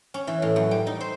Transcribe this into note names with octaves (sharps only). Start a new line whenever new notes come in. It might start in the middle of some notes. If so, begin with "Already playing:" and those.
C#4
E3
A2
F#2
G3
D#4
C5